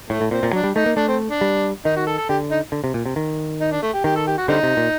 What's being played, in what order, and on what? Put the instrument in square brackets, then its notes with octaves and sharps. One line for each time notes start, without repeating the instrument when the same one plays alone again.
[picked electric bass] A2 [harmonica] A3
[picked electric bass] A2
[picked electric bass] A#2 [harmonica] C4
[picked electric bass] A#2
[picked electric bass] F#3 [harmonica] D4
[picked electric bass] G3
[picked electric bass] A3 [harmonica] D#4
[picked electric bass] A#3
[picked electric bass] A3 [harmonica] D4
[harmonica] C4
D4
[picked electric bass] G3
[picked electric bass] D#3 [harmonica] D#4
[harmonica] F#4
A4
A4
[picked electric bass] D3 [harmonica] G4
[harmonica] D#4
[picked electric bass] D3
C3
A#2
C3
D#3
[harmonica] D#4
D4
A3
G4
[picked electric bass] D#3 [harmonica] G4
[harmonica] A4
G4
F#4
[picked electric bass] D3 [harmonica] G3 C4 D#4
[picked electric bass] C3
A#2